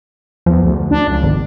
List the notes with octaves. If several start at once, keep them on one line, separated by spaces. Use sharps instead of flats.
E2 F3
D2
D4
C#2
G#1